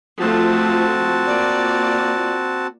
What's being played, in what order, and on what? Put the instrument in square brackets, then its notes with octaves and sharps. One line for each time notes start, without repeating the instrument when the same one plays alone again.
[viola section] F3 A3 F4 [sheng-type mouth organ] C4 F#4 A5
[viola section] A#3 F4 D5